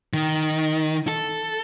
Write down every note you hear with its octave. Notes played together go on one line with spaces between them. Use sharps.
D#3
A4